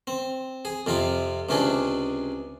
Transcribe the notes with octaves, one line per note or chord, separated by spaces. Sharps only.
C4
G#4
F2 C3 E4 F4
C#2 C3 C#4 D4 G#4